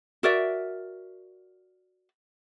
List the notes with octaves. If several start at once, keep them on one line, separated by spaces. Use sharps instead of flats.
F#4 A#4 D5 E5